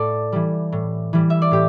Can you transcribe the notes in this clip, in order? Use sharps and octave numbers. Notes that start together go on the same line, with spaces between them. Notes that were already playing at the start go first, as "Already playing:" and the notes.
Already playing: A2 A4 D5
E3 G3
A2
E3 G3
E5
D5
A2 G4